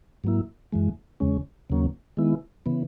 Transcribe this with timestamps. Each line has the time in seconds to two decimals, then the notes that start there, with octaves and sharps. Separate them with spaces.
0.24 G#2 F#3 A#3 E4
0.72 F#2 E3 G#3
1.20 E2 C#3 G#3 C#4
1.70 D#2 C#3 F#3 A#3 C#4
2.17 D#3 G#3 B3 E4
2.66 C#3 E3 B3